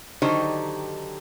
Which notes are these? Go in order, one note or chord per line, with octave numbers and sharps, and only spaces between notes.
D3 D#3 F#3 D#4 G4 C5